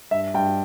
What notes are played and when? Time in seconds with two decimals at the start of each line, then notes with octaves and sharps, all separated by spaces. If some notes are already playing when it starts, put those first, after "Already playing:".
0.11 G2 E5
0.34 G2 G5